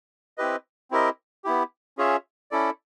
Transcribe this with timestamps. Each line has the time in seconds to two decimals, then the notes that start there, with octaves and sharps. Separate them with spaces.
0.38 C4 E4 G4 B4 D#5
0.91 C4 E4 G4 A#4 D#5
1.45 B3 E4 G4
1.98 C#4 F4 G#4 C#5 E5
2.51 C#4 E4 A4 D5